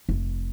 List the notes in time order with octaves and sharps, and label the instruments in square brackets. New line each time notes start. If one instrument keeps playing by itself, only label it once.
[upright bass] F1